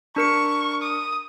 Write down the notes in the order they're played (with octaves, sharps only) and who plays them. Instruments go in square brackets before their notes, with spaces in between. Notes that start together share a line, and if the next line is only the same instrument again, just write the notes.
[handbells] D4 A#4 C#7 [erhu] C#6
[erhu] D#6